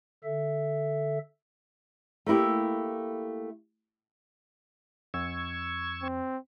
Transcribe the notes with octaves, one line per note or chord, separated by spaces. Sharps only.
D3 A4 E5
A3 A#3 E4 G4
F2 C#6 E6 G#6
C4